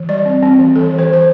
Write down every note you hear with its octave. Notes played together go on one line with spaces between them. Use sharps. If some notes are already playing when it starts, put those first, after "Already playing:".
Already playing: E3
G3 D5
C4
C4
E3
E3 A4
E3
C5
E3 C5